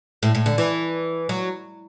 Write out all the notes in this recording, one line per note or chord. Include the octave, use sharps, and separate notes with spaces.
A2
A2
D3
E3
F#3